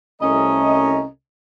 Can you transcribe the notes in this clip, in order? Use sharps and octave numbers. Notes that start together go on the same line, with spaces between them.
C2 A3 C#4 D#5 A#5